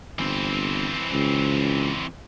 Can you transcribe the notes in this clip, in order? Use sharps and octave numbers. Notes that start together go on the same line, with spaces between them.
G1 E3 C4
C#2